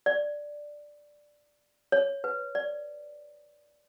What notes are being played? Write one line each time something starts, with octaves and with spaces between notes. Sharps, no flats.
D5
C#5
B4
D5